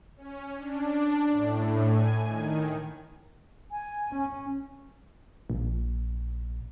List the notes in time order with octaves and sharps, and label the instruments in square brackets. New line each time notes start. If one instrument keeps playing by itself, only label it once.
[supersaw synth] C#4
D4
A2
G#5
D#3
[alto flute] G#5
[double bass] C#4
[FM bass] A#1